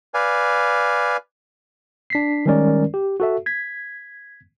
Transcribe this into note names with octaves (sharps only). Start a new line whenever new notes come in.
B4 D5 F5 G#5
D4 B6 C7
D#3 G3 G#3 C#4 A#4 D5
G4
F#4 A4 E5
G#6 B6